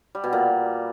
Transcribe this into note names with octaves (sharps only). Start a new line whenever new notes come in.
G3
B2
A#2